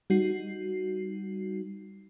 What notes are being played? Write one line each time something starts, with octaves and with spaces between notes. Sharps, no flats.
G3 D#4 F#4 C7